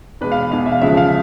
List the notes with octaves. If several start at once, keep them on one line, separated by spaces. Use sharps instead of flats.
E2 B2 G#3 B4
F5
E2 B2 G#3 F5
E5
F5
D2 C#3 F3 G#3 E5
F5